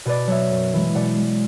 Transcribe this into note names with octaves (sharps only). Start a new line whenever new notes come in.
B2 B4 D5
F#3 C#5 E5
F#2
E3 G#3
B2 D5 F#5
G#3